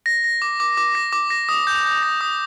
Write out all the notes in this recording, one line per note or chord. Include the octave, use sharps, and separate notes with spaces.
A#6
A#6
D6
D6
D6
A#6
D6
A#6
D#6
G6
G6
A#6
D#6